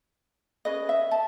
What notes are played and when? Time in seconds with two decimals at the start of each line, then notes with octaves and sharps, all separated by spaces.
0.65 C#4 G#4 B4 D#5
0.89 E5
1.11 A5